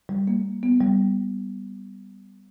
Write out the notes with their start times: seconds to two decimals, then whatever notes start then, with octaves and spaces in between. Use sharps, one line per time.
0.09 G3
0.28 A#3
0.63 B3
0.80 G3